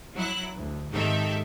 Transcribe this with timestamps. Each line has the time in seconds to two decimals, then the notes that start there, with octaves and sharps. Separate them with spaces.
0.15 F#3 E4 F#6
0.54 D2
0.90 G#2 D#3 C4 G4 A4 E5